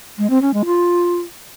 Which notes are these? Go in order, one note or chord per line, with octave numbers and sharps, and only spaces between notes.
G#3
C4
C#4
G#3
F4